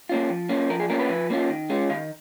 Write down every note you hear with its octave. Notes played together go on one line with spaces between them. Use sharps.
A#3 C#4 F4
F3
A#3 C#4 F4
F3 A#4
G#4
A#3 C#4 F4 A#4
B4
F3
A#3 C#4 F4
D#3
G#3 C#4 F4
D#3 F5